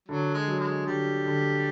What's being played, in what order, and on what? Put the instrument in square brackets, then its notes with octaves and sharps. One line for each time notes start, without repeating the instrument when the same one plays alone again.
[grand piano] D3 [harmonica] F#3
[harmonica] G#3
[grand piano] F#3
[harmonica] G#3
[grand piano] D3 [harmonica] G3
[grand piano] D3